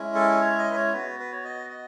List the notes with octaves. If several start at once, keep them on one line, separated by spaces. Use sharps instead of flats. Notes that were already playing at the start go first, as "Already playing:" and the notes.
Already playing: G#3 C#4 E4
A4
C#5
D#5
B4
C#5
B3 F#4 B4
B4
C#5
D#5
D#5